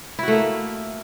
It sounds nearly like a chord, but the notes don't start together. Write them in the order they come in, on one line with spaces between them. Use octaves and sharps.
E4 F#4 A3 A#3